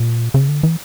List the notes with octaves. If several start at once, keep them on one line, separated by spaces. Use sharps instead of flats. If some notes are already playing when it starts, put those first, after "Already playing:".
Already playing: A#2
C#3
D3
E3